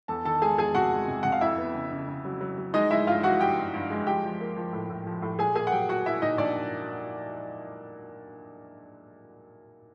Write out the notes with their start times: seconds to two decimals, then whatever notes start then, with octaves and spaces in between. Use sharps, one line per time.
0.08 E2 A4 A5
0.25 D#3 A4 A5
0.42 G#3 G#4 G#5
0.58 E2 G#4 G#5
0.75 C3 F#4 F#5
0.92 G#3
1.08 C3
1.23 C3 F#5
1.32 F5
1.41 F2 E4 E5
1.58 B3
1.75 C#3
1.91 C#3
2.08 C#3
2.25 F#3
2.41 F#3
2.58 F#3
2.74 G#3 D#4 D#5
2.91 G#3 E4 E5
3.07 G2 F4 F5
3.23 E3 F#4 F#5
3.40 G2 G4 G5
3.57 G2
3.74 G2
3.90 G#3
4.07 F3 G4 G5
4.24 F3
4.40 A#3
4.56 F3
4.73 A2
4.90 A2
5.07 F3
5.22 A2
5.39 A#2 G#4 G#5
5.55 A#3 G#4 G#5
5.67 F#5
5.72 F#3 G4 G5
5.89 A#3 F#4 F#5
6.06 A#3 E4 E5
6.22 A#2 D#4 D#5
6.38 A#2 D4 D5